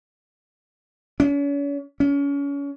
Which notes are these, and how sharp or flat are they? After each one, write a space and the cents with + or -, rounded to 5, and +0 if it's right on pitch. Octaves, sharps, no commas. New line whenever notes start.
C#4 +40
C#4 +30